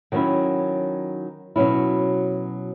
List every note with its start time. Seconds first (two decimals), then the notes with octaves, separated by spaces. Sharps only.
0.12 D#3 F#3 C#4 E4
1.56 B2 F#3 C#4 E4